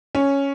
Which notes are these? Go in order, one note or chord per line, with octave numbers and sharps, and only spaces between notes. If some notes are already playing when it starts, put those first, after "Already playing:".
C#4